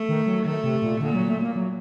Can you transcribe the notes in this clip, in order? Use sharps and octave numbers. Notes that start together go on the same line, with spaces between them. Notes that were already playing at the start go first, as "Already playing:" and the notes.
Already playing: A3
D#3
F#3
D#3 A3
C3
A#2
A#2 D3
F#3
A3
A#3
F#3